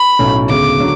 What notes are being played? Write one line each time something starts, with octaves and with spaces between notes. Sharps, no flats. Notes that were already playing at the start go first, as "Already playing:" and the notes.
Already playing: B5
B1 A2 F#3 A3 C#4
D2 C#3 G#3 B3 D6
D3 F#3